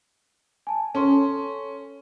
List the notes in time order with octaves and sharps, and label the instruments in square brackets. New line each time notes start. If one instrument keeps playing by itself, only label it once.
[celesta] G#5 A5
[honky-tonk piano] C#4 [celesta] A4 C6